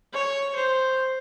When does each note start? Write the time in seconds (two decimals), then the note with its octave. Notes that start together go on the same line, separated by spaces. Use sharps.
0.13 C#5
0.55 C5